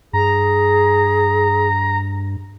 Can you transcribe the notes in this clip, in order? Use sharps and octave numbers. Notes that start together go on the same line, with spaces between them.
G2 G#4 A#5